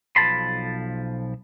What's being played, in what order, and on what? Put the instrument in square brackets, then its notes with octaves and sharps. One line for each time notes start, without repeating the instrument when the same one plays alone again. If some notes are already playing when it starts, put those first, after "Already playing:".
[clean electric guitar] B1 F3 A4 A5 B5 C6